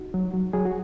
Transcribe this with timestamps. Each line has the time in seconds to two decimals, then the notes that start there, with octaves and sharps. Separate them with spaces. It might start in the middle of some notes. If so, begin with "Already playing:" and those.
Already playing: D#4 F#4
0.14 F#3
0.34 F#3
0.53 F#3 G#4
0.65 F#4